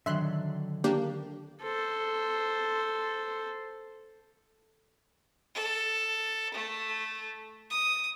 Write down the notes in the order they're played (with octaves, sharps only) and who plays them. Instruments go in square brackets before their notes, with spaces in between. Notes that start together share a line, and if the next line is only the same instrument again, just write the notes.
[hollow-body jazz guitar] D3 D#3 F#3 [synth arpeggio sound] E5 C6 F#6
[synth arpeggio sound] A#3 D4 G4
[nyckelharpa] A4 C5
[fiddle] A4
A3
D#6